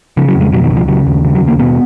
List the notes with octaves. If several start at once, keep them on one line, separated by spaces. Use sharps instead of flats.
C#3 F3
F#3
F2
G#3
B2 F#3
D#3
C#2
F3
C#3 F#3
D#2
C#3
F#3
D#2
A#3
B2 B3